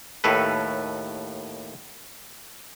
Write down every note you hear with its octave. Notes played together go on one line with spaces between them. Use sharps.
D#2 A2 A4 B4